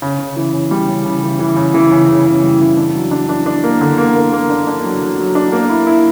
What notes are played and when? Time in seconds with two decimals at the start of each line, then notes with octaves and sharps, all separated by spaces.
0.02 C#3
0.19 C#3
0.36 E3
0.53 C#3
0.71 G3
0.88 C#3
1.05 C#3
1.23 E3
1.39 E3
1.56 C#3
1.74 E3
1.91 C#3
2.09 C#3
2.26 C#3
2.43 G3
2.61 E3
2.77 D4
2.95 F#3
3.11 D4
3.29 D4
3.46 D4
3.64 A#3
3.81 D3
3.98 A#3
4.15 A#3
4.33 A#3
4.49 D4
4.67 D4
4.84 F#3
5.02 F#3
5.19 F#3
5.35 D4
5.52 A#3
5.70 E4
5.87 E4